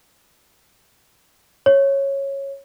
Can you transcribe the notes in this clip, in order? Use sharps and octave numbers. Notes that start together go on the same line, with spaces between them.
C#5